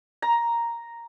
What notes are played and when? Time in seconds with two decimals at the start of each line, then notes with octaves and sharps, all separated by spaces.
0.22 A#5